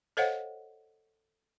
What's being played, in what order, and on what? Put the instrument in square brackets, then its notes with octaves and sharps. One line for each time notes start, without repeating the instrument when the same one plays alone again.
[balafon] A4 C5 C#5 D#5 F5 F#5